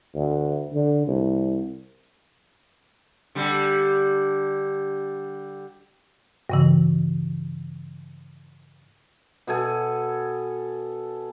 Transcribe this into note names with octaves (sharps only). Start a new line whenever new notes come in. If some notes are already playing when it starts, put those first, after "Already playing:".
D2
D3
C2
D3 G3
G2 C#3 E3
B2 A4 G#5